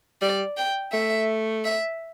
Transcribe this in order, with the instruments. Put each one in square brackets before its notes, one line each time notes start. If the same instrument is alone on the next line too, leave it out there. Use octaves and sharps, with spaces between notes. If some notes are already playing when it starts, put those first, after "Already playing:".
[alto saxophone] G3 [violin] D5
[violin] G5
[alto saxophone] A3 [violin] E5
[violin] E5